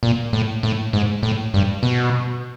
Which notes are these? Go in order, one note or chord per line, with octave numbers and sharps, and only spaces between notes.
A#2
A2
A2
G#2
A2
G2
B2